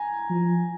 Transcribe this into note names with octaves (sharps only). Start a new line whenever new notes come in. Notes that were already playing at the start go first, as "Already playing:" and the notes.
Already playing: G#5 A#5
F3